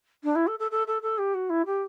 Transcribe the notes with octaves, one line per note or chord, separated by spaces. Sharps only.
D4
E4
A4
A4
A4
A4
A4
G4
F#4
E4
G4